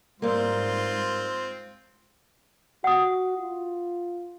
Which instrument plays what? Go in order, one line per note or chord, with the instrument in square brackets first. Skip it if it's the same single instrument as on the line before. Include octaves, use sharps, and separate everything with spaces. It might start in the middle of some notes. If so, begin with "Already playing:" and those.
[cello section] G#2 [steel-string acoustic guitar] G3 A#3 [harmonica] C4 F4
[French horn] F#4 [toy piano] F#5 D#6
[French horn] F4